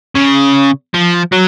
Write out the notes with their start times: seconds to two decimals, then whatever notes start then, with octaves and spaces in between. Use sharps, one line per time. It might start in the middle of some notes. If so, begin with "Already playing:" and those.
0.15 C#3
0.94 F3
1.32 F#3